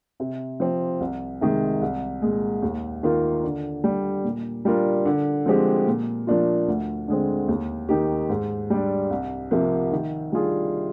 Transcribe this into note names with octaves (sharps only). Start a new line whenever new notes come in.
C3
F3 C4
C2
C3 D#3 G#3
C2
A#2 G#3
D#2
D#3 A#3 F4 A#4
D3
G3 D4
A#2
G3 D4 F4 A#4
D3
F3 G#3 C4 G4
A#2
F3 A#3 D4 F4
D2
D3 G#3 C4
D#2
D#3 A#3 D#4 G4
G#2
G3 D4
C2
C3 F3 A#3
D#3
G3 D4 F4 G#4